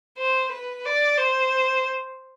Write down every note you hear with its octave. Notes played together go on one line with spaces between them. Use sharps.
C5
B4
D5
C5